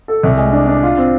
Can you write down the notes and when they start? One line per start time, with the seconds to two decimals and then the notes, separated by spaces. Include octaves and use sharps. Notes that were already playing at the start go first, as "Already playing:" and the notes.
0.08 A4
0.23 C2
0.37 G#3
0.52 D4
0.68 D4
0.83 F4
0.98 C4